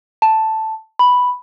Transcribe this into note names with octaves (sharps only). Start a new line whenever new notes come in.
A5
B5